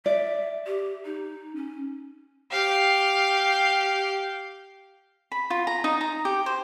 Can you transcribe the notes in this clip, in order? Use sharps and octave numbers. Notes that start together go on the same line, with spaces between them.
D5 E5
G4
D#4
C#4
G4 F5
B5
F4
A#5
D#4
A#5
G4
C5